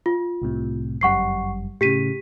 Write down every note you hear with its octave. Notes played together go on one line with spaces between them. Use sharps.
F4
C2 A2 C3
G1 F#2 G3 F#5 C#6 C7
A2 C#3 G4 B6 D#7